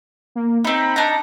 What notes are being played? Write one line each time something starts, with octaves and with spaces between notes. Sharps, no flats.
A#3
C4 D#4 B5
D4 D#4 A#5